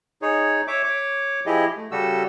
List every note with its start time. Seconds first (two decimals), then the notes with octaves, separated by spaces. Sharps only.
0.22 D#4 G#4 C#5
0.68 C#5 E5 D6
0.83 C#5 D6
1.46 F3 E4 G4 G#4 D#5
1.77 A3
1.91 C#3 G3 F#4 G4 A4 E6